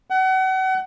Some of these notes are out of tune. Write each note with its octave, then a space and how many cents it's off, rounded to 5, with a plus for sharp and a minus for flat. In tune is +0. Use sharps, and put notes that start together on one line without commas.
F#5 +35